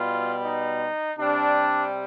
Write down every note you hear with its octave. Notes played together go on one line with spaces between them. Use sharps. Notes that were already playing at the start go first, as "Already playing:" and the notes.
Already playing: B2 G3 F4
D#4
C3 G3 D4